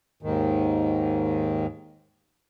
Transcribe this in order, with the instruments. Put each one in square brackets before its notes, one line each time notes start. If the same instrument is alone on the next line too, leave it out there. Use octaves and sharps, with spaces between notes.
[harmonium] D#2 G#2 D#3